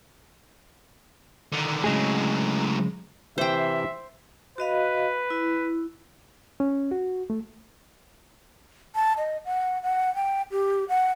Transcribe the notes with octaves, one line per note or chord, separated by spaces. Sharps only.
D3 D#3
A2 C#3 F#3 G#3 G#4
C3 E3 C5 E5 G5
F#4 B4 D#5 F5
E4
C#4
F#4
A3
A5
D#5
F#5
F#5
G5
G4
F#5